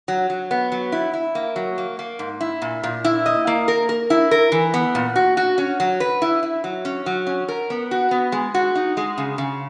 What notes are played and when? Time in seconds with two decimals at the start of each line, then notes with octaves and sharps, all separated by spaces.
0.08 F#3
0.30 F#3
0.51 B3
0.72 F#3
0.92 E4
1.13 E4
1.35 A#3
1.56 F#3
1.78 A#3
1.99 A#3
2.19 G#2
2.41 E4
2.62 A#2
2.83 A#2
3.05 E4
3.26 D#5
3.47 A#3
3.68 A#4
3.89 A#4
4.10 E4
4.31 A#4
4.52 E3
4.74 B3
4.95 A#2
5.16 F#4
5.37 F#4
5.58 C#4
5.80 F#3
6.00 B4
6.22 E4
6.43 E4
6.64 F#3
6.85 C#4
7.06 F#3
7.27 C#4
7.48 A#4
7.70 B3
7.91 F#4
8.11 B3
8.32 G#3
8.54 F#4
8.75 D#4
8.97 G#3
9.18 C#3
9.38 C#3